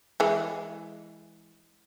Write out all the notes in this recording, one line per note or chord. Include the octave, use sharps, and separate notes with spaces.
E3 G#3